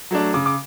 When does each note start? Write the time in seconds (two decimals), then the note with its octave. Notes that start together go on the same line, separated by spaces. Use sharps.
0.11 F#3 A3 D4
0.34 C#3 D6
0.46 D6